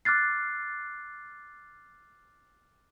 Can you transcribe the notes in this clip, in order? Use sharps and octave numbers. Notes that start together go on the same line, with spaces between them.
D6 F6 F#6 A6 C7